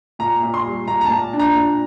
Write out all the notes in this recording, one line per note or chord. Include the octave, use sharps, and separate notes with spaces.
A#2 A#5
A#2
C6
G3
A#2 A#5
A#5
A#2 A5
D4
A#5
A#2